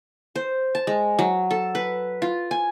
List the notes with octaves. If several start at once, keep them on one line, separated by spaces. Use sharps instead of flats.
C5
A5
G#3
F#3
A4
B4
F4
G#5